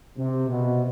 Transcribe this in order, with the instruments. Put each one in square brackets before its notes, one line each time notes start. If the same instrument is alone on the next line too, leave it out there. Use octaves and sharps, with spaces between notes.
[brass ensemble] C3
B2